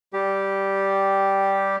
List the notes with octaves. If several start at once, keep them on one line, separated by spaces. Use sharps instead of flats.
G3 G4